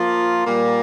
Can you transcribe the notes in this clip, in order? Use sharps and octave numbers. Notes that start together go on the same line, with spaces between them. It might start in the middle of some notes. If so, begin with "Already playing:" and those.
Already playing: F3 A#3 F4
A#2 G3 A#3